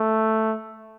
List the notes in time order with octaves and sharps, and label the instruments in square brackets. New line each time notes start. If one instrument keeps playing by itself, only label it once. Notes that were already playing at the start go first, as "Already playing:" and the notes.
Already playing: [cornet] A3